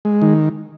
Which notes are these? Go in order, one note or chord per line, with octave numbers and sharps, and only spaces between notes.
G#3
D#3